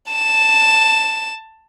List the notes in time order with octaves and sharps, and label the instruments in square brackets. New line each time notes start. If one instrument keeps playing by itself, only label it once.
[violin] A5 E7